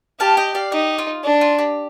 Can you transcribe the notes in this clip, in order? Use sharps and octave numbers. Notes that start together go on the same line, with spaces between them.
G4 F5 A5
D#5 G5
D5 F5
D#4 G4
F4
D4
F4
G4